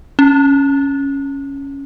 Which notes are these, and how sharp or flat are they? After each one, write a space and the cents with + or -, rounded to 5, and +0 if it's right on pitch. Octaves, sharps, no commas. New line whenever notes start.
C#4 +0